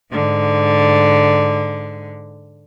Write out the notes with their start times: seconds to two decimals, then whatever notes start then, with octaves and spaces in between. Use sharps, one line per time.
0.12 G#2 D3